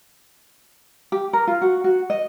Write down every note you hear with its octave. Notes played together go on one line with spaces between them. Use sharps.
G4
A#4
F4
F#4
F#4
D#5